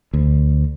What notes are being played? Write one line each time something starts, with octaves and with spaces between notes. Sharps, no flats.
D2